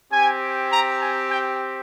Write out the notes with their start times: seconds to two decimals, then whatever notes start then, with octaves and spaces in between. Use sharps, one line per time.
0.12 C4 G4 G#5
0.72 A#5
1.01 G#5
1.32 G5